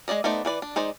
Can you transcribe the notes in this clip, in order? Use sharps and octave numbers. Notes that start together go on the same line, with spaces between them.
G#3 E4 D5 D#5
A3 B3 D#4 C5 D5
E3 B4 D5
D4
G#3 D#4 C5 D5